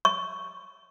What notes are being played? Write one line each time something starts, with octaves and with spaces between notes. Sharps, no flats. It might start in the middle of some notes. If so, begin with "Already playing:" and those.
C#6